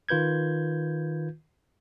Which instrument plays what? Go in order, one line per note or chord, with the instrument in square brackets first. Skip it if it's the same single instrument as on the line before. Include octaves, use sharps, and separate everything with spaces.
[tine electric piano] D#3 F4 B4 G6 G#6